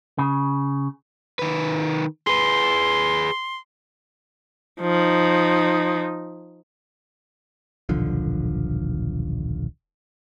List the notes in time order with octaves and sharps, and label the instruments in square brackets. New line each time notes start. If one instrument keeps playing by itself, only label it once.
[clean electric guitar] C#3
[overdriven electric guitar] D#3 B4
[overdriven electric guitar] G#4 B4 [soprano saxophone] C6
[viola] F3 D#4
[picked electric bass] D#1 B1 D3 F3